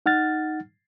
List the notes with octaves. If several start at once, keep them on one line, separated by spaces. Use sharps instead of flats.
D#4 F#5 F6 A6